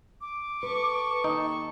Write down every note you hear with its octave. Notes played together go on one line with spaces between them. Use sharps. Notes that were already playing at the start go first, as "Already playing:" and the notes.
D6
A4 B4 C#6
D#2 D#4